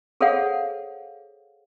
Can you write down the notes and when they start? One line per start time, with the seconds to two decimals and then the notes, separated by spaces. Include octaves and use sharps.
0.21 G#4 A4 C5 C#5 F5 F#5